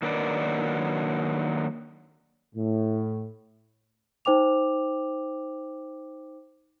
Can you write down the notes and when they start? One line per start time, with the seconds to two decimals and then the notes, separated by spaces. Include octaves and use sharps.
0.02 D#3 F#3 A#3 D4 B4 D5
2.55 A2
4.25 D#4 C5 G5 D6 F7